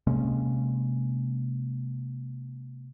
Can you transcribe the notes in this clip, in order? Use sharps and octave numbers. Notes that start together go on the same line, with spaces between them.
C3 G#3 A#3 C#4